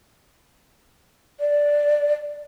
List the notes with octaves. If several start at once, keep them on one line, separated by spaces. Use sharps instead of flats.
D5